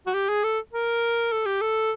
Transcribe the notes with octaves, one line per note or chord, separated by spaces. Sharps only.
F#4
G4
G#4
A4
A#4
A4
G4
A4